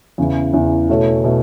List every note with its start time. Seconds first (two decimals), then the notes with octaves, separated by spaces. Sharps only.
0.18 E2 C#3 E3
0.54 E2 C#3 E3
0.89 B2 A3 E4 A4 C#5
1.24 B2 A3 E4 A4